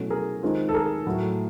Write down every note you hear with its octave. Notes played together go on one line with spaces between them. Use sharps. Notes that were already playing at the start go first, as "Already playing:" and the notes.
Already playing: B2 F#3 A3 C#4 E4
G#4 A#4
D#3 G#3 C4 F4
A4
G#4 A#4
A2 F#3 A3